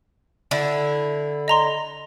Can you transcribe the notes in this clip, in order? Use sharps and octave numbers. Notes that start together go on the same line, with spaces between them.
D3 E4
D#5 A#5 C6